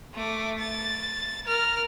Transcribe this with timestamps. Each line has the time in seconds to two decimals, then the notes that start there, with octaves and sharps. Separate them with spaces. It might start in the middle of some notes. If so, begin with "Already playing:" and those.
0.15 A3 D6
0.59 A6
1.46 A#4 F6